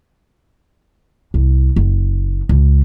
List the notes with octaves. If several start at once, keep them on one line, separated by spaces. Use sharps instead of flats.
C2
F#1
C#2